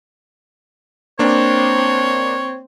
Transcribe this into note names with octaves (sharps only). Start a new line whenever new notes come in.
A#3 C4 D4 C#5